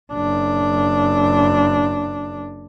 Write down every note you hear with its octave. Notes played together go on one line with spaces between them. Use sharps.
F#1 D4